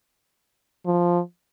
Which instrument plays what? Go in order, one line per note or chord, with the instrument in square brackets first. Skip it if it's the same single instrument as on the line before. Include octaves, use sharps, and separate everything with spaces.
[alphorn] F3